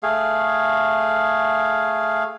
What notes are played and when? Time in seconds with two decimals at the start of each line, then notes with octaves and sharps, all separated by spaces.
0.03 A3 G#4 F5